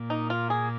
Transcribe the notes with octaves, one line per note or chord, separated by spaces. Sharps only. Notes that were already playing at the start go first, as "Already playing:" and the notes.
Already playing: A#2 A#3
D#4
F4
G#4